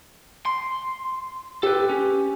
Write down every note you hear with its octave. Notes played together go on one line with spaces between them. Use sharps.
C6
G4 A4 B4
C#4